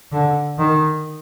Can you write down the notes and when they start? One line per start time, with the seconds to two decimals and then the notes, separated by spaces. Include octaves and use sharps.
0.12 D3
0.58 D#3